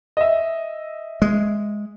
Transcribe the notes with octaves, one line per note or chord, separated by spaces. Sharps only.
D#5 E5
G#3